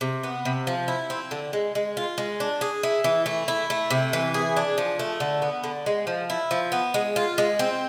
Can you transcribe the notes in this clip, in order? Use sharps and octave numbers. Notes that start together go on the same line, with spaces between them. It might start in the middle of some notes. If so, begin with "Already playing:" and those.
C3
B3
C3
F3
E4
C4
D3
G#3
G#3
F4
G#3
D4
G#4
E4
E3
A3
E4
A3
C3
E3
G#4
D4
F3
A3
D3
B3
D3
G#3
F3
E4
F3
B3
G#3
F4
G#3
C4